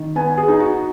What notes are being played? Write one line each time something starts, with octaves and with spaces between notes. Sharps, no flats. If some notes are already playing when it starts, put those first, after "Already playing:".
Already playing: D#3
B3 G#5
G#4
D#4
F#4